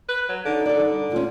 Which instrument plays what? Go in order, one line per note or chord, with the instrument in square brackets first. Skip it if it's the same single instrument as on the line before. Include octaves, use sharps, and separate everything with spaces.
[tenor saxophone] B4
F#3
[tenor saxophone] D3 [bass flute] D#4
[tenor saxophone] D3 [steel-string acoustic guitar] A4 D5
[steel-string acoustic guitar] G2
[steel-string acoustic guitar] D2 C#4 [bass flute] F4